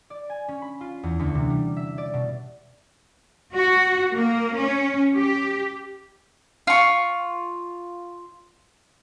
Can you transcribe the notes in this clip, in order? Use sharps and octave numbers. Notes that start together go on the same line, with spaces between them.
D5
G#5
C#4
B5
F4
E2
D2
C3
G3
E5
D5
B2
F#4
A#3
C#4
G4
F4 C#6